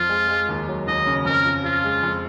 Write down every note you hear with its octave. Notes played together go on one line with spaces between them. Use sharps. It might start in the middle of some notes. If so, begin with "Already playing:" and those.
Already playing: F2 F3 F4
G#3
G#3
D#2
F#3
D#2 D#5
C#3
F2 A#4
F3
F3 F4
G#3
F2